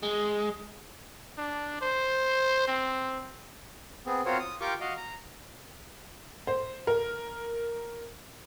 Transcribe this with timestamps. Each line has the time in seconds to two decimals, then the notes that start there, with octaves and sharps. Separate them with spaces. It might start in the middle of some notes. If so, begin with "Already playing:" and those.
0.03 G#3
1.38 D4
1.81 C5
2.67 C4
4.06 B3 C4 G#4
4.26 C4 F4 F#4 A#4 C5 C#5
4.40 D#6
4.61 F4 G4 A#4 G5 C#6 D6
4.81 F#4 D#5 F5
4.97 A#5
6.47 C5
6.87 A#4